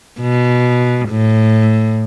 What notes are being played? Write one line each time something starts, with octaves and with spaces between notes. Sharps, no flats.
B2
A2